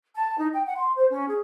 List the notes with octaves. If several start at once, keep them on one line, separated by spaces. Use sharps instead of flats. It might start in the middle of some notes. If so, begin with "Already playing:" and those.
A5
D#4
G5
F#5
C6
C5
C#4
G#4